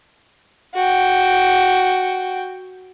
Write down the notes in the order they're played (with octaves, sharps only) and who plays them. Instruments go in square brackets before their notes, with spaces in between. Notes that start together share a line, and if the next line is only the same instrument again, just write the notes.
[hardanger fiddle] F#4 G5